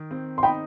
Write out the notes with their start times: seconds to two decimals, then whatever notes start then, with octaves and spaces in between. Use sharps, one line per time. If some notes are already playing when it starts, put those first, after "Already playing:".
Already playing: D#3
0.11 C4
0.38 C6
0.43 D#4 G5 B5